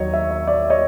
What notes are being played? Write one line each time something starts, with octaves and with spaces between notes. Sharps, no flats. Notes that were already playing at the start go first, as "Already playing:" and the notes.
Already playing: D#2 F#3 C#5 D#5
E5
E5
D5 E5
C#5 D#5